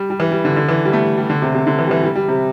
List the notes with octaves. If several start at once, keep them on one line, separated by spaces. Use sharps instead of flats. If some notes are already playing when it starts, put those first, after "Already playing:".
Already playing: G3
G3
E3
G3
D3
D3
E3
G3
A3
G3
D3
C3
C3
D3
E3
G3
E3
G3
G3
C3